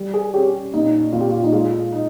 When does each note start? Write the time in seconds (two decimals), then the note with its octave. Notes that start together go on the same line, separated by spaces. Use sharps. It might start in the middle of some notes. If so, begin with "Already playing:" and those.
Already playing: G3
0.14 G#4
0.34 C#4 G4
0.73 A#2 D#4
1.13 A#2 F4
1.21 G4
1.30 F4
1.44 D#4
1.53 G#3 F4
1.93 D#4